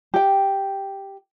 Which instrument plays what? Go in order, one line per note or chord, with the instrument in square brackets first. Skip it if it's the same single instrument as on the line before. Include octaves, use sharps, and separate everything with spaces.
[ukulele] G4 G5